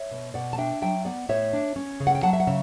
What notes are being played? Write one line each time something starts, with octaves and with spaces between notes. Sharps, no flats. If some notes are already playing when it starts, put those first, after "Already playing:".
Already playing: C#5 E5
B2
B2 D5 F#5
A5
D4 E5 G5
F#3 E5 G5
B3 D5 F#5
A2 C#5 E5
D4
C#4
C#3
F#5
G5
F#3 F#5 A5
E5
F#5
C#3 E5